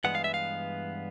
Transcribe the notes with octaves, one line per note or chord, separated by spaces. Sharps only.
G2 E3 G#3 B3 F#5
F5
E5
F5